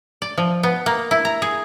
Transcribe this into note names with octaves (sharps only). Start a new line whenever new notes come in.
D5
F3
B3
A#3
E4
A#5
G#4